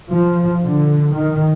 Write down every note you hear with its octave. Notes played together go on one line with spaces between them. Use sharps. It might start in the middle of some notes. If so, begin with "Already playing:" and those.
F3
D3
D#3